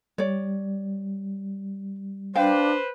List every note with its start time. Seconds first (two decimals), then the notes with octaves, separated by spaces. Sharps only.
0.18 G3 C#5 D5
2.36 D4 B4 C5 F5 G5